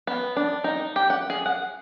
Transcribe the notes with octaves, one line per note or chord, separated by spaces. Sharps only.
B3
D4
D#4
G4
F#5
G#4
F#5